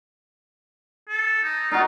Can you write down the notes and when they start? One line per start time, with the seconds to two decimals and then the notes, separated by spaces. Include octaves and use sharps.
1.09 A4
1.44 D#4
1.71 D#4 F4 F#4